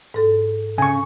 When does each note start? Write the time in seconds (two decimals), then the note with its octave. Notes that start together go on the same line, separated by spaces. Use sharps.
0.14 G#2 A4
0.78 C#3 G#5 C#6